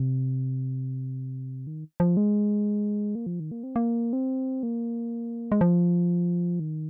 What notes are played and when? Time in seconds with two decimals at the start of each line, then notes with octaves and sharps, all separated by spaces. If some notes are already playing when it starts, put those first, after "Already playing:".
Already playing: C3
1.67 D#3
2.00 F3
2.17 G#3
3.15 A#3
3.26 F3
3.40 D#3
3.51 A#3
3.63 C4
3.76 A#3
4.13 C4
4.63 A#3
5.52 G#3
5.61 F3
6.60 D#3